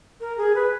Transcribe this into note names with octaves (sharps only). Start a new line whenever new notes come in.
A#4
G#4
B4